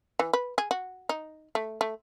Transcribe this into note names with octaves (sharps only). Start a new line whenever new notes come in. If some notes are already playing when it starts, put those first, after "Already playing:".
E3
B4
G#4
F#4
D#4
A3
A3